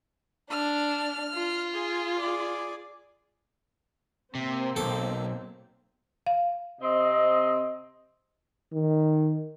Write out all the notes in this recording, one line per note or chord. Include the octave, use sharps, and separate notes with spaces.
D4 F6
F4
G#4
G#4 D5
C3 A#3 C4
B1 A4
F5
C3 C4 D#5
D#3